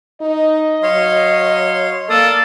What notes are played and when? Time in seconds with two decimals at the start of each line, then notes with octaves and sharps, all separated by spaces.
0.21 D#4 D#5
0.83 F#3 C#5 F5 C6
2.10 A#3 A4 D5 F5 D#6